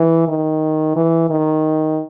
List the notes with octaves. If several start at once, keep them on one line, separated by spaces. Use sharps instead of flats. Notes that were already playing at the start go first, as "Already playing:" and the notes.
Already playing: E3
D#3
E3
D#3